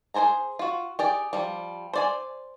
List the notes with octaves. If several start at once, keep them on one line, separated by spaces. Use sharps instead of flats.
G#4 A#4 C5 G#5 A#5
F4 F#4
G4 G#4 D5
F3 G3
C5 D5 G#5